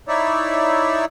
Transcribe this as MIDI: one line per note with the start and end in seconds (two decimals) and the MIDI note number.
0.08 1.05 63
0.08 1.05 64
0.08 1.05 73
0.08 1.05 74
0.08 1.05 76